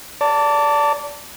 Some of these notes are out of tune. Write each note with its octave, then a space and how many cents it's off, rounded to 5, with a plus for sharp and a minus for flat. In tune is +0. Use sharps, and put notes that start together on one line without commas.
D5 -20 A5 +20